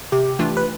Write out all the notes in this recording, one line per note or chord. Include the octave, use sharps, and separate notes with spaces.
C3 G4
E3 A3 D4 F4
B4